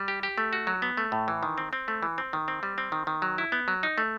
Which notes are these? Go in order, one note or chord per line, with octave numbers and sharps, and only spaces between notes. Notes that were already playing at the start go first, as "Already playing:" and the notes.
Already playing: G3
G4
G4
A3
F#4
F#3
B3
A3
A2
E3
D#3
C4
C4
A3
E3
C4
D#3
C4
G3
C4
D#3
D#3
F#3
E4
B3
F#3
D#4
A3